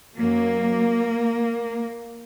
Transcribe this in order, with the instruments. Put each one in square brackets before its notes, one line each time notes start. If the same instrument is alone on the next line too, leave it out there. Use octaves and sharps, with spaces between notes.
[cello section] F#2 F#3 A#3